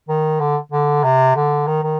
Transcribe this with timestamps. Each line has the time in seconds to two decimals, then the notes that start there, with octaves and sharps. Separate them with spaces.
0.09 D#3
0.40 D3
0.72 D3
1.04 C3
1.36 D3
1.67 D#3
1.83 D#3